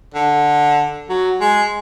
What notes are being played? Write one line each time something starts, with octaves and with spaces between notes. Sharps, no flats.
D3
F#3
G#3